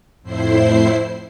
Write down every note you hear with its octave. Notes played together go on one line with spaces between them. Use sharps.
F2 A2 E4 C5 C7